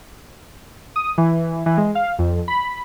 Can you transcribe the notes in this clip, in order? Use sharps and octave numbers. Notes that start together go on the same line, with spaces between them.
D#6
E3
E3
G#3
F5
F2
B5